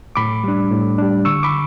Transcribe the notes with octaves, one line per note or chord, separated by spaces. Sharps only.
A2 B5 D6
G3 D4
A2
G3 D4
D3 C#6 E6
B5 D6